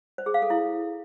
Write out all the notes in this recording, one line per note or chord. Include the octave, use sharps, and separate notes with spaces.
C5
G#4
F5
A4
E4